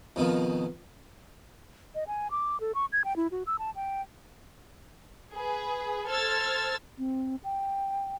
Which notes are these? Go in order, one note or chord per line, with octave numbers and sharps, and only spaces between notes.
F2 B2 D#3 F3
D#5
G#5
D6
A4
C#6
G#6
G5
E4
F#4
E6
A5
G5
G#4 B4
A4 C5 E6 F6 G#6 A6
C4
G5